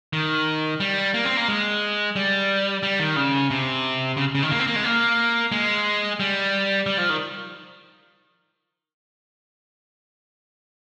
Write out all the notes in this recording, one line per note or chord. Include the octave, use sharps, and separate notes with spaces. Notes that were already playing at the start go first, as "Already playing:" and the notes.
D#3
G3
A#3
C4
A#3
G#3
G3
G3
D#3
C#3
C3
C#3
C#3
D#3
A#3
C4
A#3
G#3
A#3
G#3
G3
G3
F3
D#3